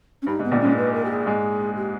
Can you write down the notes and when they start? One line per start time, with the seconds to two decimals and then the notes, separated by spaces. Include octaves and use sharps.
0.22 C#4
0.27 G2 D#4
0.39 G#2
0.44 B3
0.51 A#1 A#2
0.61 G#2 G#3 C#4
0.77 B4
0.93 A#4
1.05 G4
1.10 G#4
1.26 G#2 G#3
1.76 G4